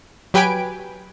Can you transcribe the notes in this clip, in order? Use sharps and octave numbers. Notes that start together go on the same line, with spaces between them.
F#3 G4 B4 G5 G#5 D7